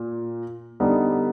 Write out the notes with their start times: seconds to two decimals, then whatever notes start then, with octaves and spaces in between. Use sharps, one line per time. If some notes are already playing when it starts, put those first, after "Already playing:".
Already playing: A#2
0.80 D3 G3 B3 D#4